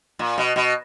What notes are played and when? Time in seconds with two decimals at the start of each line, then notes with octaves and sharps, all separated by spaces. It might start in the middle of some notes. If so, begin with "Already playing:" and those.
0.19 A#2
0.38 B2
0.56 B2